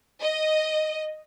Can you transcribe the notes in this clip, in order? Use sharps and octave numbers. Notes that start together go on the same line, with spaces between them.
D#5